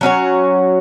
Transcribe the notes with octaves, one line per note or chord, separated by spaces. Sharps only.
F#3 C#4 F#4 C#5